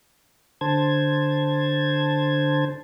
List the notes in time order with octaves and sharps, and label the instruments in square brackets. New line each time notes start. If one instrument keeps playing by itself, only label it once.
[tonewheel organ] D3 C5 A5 G#6